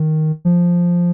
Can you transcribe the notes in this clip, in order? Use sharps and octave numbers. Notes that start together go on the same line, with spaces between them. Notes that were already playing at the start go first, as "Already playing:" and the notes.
Already playing: D#3
F3